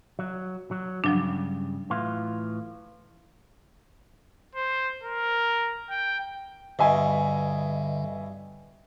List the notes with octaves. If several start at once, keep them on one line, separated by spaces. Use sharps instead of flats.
F#3
F#3
G2 C#3 F3 F#3 D4
A2 E3 F4
C5
A#4
G5
G2 B2 D3 D#5 E5 G#5